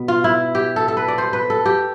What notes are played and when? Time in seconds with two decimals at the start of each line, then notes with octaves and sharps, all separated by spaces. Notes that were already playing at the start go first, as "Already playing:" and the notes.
Already playing: B2 B3
0.08 F4
0.24 E4
0.55 G4
0.76 A4
0.88 A4
0.97 B4
1.08 D5
1.18 C5
1.33 B4
1.50 A4
1.66 G4